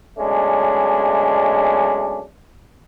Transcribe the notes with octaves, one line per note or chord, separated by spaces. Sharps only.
B1 G#3 A3 C#4 D4